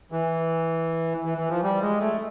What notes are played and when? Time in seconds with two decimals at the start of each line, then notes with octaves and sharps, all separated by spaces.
0.12 E3
1.25 E3
1.38 E3
1.49 F3
1.62 G3
1.82 G#3
2.00 A3